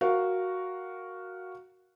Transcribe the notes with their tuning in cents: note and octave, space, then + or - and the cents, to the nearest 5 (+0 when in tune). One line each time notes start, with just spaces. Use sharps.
F#4 +0 A#4 +0 F5 +0